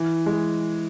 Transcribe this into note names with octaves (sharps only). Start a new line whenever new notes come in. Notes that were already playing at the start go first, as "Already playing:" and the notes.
Already playing: E3
G#3